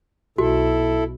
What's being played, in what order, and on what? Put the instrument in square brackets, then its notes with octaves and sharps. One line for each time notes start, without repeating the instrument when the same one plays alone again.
[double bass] B1 [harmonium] E4 A4 [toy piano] F#4